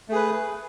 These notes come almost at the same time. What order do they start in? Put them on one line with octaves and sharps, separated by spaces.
A3 G#4 B4